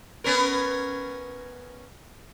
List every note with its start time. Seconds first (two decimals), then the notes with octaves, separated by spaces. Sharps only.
0.24 B3 C#4 A#4